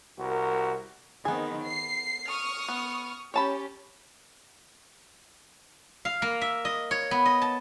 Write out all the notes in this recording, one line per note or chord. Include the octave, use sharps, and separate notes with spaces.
C2 F#4 A#4
D#3 B3 C4 G#4
C7
C#6 D#6 F6
B3
C#4 G4 C#5 A5 B5
F5
A#3
E5
D#5
C#5
B3
D#5
A5